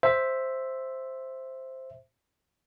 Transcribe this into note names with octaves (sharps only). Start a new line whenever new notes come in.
C5 E5